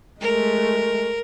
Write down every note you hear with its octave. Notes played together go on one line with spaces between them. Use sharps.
G#3 A3 A#4